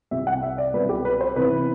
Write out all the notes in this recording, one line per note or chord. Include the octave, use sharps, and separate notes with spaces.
C2 C3 G3 E5
F#5
E5
D5
C2 B2 F#3 C4 B4
G4
B4
C5
C3 E3 B3 B4